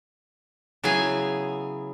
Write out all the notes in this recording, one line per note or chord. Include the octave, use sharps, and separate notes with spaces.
C#3 F#3 B3 E4 G#4 G#5